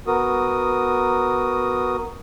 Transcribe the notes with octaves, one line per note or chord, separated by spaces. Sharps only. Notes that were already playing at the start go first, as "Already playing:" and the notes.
B3 F#4 A#4 D#6